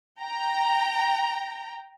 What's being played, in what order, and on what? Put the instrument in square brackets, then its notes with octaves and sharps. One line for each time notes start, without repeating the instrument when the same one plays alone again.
[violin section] G5 A#5